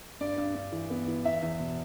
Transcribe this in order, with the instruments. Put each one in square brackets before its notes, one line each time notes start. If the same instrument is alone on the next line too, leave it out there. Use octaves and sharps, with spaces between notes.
[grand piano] G2 D5
G2
G2
E3
B3
E3
E2 E5
E2
B2